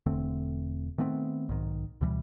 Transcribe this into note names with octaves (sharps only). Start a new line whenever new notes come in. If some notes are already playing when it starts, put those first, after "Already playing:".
E1 D3 A3 C4
D#3 A3 B3 C4
B1 G#2 D#3
D2 B2 E3 G3